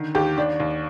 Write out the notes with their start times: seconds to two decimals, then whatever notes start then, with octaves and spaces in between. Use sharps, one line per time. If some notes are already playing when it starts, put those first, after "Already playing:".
Already playing: D3 D#3
0.15 D#2 G4
0.38 D#2 D4
0.60 D#2